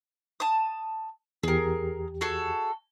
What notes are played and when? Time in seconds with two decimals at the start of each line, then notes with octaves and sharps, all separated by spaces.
0.40 A5 D#6
1.43 E2 G4 G#4 A#4
2.21 F#4 G#4 A4